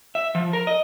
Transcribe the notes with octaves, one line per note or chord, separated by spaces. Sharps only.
E5
F3
A#4
D#5